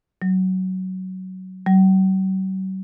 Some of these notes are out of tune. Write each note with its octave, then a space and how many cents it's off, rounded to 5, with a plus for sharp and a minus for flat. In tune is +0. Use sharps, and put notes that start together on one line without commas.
F#3 +15
F#3 +45